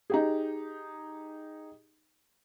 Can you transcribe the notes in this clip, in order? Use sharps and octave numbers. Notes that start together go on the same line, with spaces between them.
D#4 G4 G#4